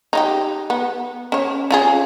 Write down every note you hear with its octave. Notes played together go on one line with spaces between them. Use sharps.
D#4 F4 G4
B3
C#4 C#5
C#4 F4 G#4